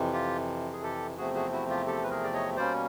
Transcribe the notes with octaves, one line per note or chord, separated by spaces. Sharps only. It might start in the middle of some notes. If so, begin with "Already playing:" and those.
Already playing: F2 C3 E3
F4 G4
G#4
G4 A4
E2 C3 F3 A3 C4 F#4 G#4
F#4 G#4
E4 F#4
F4 G4
G4 A4
B4
G#4 A#4
D5
C#5 D#5
B2 G3 A#3 C#4 C5 D5